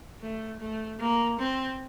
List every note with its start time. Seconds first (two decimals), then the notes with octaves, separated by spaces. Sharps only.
0.21 A3
0.60 A3
1.00 A#3
1.39 C4